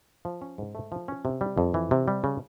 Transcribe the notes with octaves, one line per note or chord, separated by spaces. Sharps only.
F3
C#4
G#2
A3
F3
C#4
C3
G3
F2
E3
C3
G3
C#3